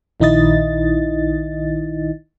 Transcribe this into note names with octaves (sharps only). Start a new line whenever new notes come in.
A#1 D#3 D#4 E4 D#5 A6